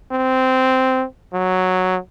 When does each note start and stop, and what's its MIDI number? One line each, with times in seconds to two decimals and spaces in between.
0.12 1.05 60
1.33 1.98 54